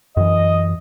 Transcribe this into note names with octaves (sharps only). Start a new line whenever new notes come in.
F#2 E3 D#5